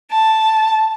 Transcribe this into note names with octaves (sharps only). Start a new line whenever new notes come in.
A5